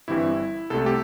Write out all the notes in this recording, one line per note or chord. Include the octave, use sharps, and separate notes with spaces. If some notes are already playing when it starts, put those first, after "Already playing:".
G1 G2 E3 G3 C4 E4
C2 C3 A3 A4
G4